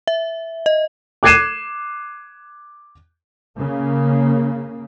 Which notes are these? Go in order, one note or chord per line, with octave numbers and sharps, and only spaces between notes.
E5
D#5
D6 F#6 G#6 C7 D#7 E7
C#3 A#3